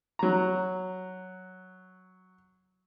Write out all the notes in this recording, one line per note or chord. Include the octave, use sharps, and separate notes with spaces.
F#3 A#5